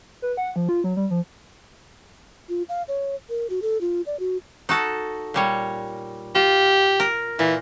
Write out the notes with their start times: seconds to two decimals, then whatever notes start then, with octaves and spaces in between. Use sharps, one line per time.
0.22 B4
0.37 F#5
0.56 F3
0.69 F4
0.84 F#3
0.97 G3
1.10 F3
2.49 F4
2.69 F5
2.88 C#5
3.29 A#4
3.50 F#4
3.62 A4
3.81 F4
4.06 D5
4.20 F#4
4.69 D#4 F#4 A4
5.34 A#2 G3 C#5
6.35 F4 G4
7.00 A#4
7.39 A#2 E3